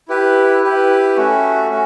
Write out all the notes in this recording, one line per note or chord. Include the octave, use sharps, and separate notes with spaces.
E4 G4 B4
E4 G4 B4
A3 C#4 F#4
C#4 F#4